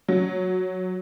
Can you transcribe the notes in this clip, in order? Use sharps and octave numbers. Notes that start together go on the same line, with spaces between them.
F#3